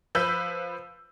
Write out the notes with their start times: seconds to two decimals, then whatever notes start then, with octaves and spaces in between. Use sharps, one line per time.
0.15 F3 B4 B5 E6 G6